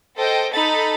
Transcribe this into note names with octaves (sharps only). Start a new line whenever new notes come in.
A4 C5 D#5 G5
D#4 A4 B5 A6